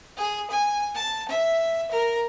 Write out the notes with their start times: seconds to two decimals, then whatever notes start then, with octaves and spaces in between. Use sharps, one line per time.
0.17 G#4
0.51 G#5
0.95 A5
1.28 E5
1.91 A#4